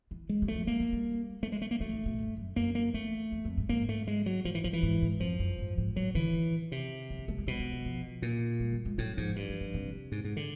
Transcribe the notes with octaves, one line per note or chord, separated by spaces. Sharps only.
E3
G#3
F#3
A3
F3
G#3 A#3
A3
G3
G3 A3
G#3
A3
A#3
F#3 A3
D#3
B2
G2
F#2
F#2 A#3
A#3
E2 A3
E2
F2
G#2
G#2 A#3
A3
G#3
F#3
G#2 F3
E3
G2 F3
E3
G#2
G#2
F2 F3
F#2
G#2
G#2
A2 F#3
D3 E3
D#3
C3
F3
E3
A3
G#3
B2 G3
G#3
F#3
F3
A#2
G3
G3
G#3
A2 F#3
G#2 F3
G2
E3
F3
C3
G#2
G#2
D3